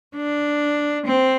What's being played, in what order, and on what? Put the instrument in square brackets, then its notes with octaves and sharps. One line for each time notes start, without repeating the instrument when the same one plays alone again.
[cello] D4
C4